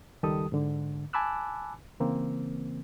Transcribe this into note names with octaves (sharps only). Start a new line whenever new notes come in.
C#2 D#3 G3 G4 A4 D#6
G#2 D3
G#5 A5 B5 D6 E6 F#6
C#3 E3 A#3 C4